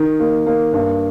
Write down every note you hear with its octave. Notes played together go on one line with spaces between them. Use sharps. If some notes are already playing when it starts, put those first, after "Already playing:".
Already playing: D#3
A#3
A#3
G2